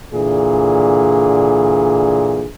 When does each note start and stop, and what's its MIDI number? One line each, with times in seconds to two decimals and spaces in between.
0.13 2.46 46
0.13 2.46 50
0.13 2.46 52
0.13 2.46 68